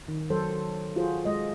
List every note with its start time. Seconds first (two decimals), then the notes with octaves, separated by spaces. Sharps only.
0.08 D#3
0.30 F#3 A4 C5
0.96 F4 F#4 G#4 C5
1.25 G#3 D#5